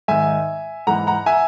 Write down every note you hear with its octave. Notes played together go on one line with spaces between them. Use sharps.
G#2 D#3 E5 G#5
G#2 E3 F#5 A#5
F#5 A#5
E5 G#5